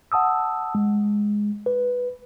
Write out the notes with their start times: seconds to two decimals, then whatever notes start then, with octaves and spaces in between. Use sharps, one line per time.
0.12 F#5 A5 D#6 E6
0.75 G#3
1.66 B4